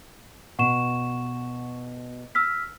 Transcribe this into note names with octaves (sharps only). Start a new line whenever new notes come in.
B2 F#5 C#6 E7
E6 F6 B6